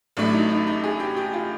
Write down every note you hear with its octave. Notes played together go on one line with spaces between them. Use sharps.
A1 A2 F#3 A3 D4
D#4
D#4
D#4
G#4
G4
G4
F4